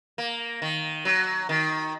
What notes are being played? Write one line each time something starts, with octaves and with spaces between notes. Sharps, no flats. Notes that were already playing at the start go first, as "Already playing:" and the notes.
A#3
D#3
F#3
D#3